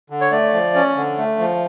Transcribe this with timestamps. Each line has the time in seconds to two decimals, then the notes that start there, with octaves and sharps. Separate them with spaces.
0.10 D3
0.21 C#5
0.31 A3 D5
0.54 F3
0.75 C#4
0.97 D3
1.18 A3
1.39 F3